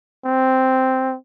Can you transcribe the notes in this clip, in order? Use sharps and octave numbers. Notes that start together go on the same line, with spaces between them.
C4